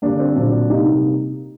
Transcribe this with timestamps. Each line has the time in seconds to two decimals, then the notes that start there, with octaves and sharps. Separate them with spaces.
0.02 D3 G3 A#3 D4
0.19 C4
0.36 A#2 F#3 A#3 D4
0.70 C3 G3 A#3 D#4